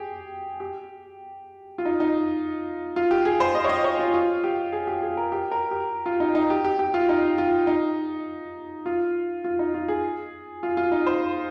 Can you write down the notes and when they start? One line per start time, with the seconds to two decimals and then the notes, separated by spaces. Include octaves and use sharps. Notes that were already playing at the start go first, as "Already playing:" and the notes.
Already playing: G4 G#4
0.60 G4
1.78 F4
1.85 D#4
2.00 D#4
2.96 F4
3.11 G4
3.25 G#4
3.40 C5
3.55 D#5
3.64 C#5
3.69 D#5
3.84 C#5
3.99 F4
4.14 F4
4.44 G4
4.72 G#4
4.87 G4
5.02 G#4
5.17 A#4
5.32 G4
5.51 A#4
5.71 G4
6.06 F4
6.20 D#4
6.35 D#4
6.50 G4
6.64 G4
6.79 G4
6.94 F4
7.09 D#4
7.38 F4
7.67 D#4
8.86 F4
9.44 F4
9.59 D#4
9.74 F4
9.88 G#4
10.63 F4
10.77 F4
10.92 D#4
11.06 C5